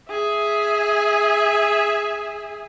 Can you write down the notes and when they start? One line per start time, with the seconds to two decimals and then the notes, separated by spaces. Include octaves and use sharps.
0.10 G#4 E5